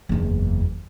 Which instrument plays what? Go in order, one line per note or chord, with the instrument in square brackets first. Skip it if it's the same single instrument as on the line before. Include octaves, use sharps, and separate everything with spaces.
[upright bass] F#1 E2